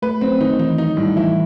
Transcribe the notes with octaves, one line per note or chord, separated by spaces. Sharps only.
A3 B4
F#3 C4
D#3 D#4
D#3
E3 D#4
D#3 D#4
F#3
A2 G3
F#3
E3 E4